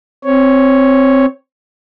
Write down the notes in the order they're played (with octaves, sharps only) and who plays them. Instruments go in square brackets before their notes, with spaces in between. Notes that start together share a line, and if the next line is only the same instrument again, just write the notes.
[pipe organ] C4 C#5